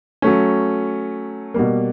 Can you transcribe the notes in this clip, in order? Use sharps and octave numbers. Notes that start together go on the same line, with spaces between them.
F#3 A3 C#4
B2 G3 A#3